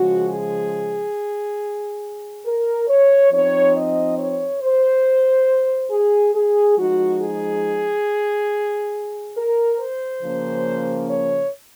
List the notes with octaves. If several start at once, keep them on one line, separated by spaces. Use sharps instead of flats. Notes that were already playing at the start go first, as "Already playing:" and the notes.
Already playing: C#3 F3 G#3 F#4
G#4
A#4
C#5
F3 C4 D#4 C#5
D#5
C#5
C5
G#4
G#4
F3 G#3 D#4 F#4
G#4
A#4
C5
C#3 F3 A#3 C#4
C#5